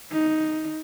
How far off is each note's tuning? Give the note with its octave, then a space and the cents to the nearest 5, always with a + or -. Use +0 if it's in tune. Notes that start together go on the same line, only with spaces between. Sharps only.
D#4 +5